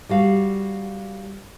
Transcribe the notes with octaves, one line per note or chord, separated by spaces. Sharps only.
G3 F#4 F5